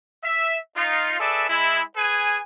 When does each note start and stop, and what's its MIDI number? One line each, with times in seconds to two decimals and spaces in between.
0.23 0.58 76
0.76 1.15 63
0.76 1.15 65
1.19 1.48 68
1.19 1.48 69
1.19 1.48 71
1.19 1.48 74
1.19 1.48 76
1.49 1.81 56
1.49 1.81 64
1.97 2.40 68
1.97 2.40 71
1.97 2.40 80